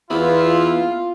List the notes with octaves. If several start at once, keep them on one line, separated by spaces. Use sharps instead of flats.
E2 B3 E4 F4